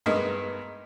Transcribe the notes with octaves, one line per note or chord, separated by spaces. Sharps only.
G2 G#3 A#3 B3 D#4